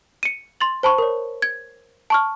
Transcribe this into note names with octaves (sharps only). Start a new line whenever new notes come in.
C#7 D#7
C6 A6 F#7
C5 A5 B5 C#6
A#4 C#5
G#6
A5 C#6 F6